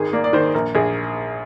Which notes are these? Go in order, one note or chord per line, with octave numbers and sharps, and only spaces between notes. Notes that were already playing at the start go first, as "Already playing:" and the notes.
Already playing: G#1 D#3 G#4
A#3 D5
D5
D#3 C5
A#1 A#4
A#1 G#4